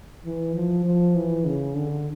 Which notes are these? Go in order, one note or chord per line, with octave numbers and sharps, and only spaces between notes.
E3
F3
F3
E3
C#3
D3